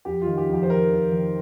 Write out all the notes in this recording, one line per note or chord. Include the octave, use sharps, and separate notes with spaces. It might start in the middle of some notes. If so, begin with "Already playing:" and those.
F2 G4
D#3 F4
G4
F2
G4
C5
D#3 A#4
F2
D#3